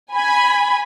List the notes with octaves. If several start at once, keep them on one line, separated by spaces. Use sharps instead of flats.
G#5 B5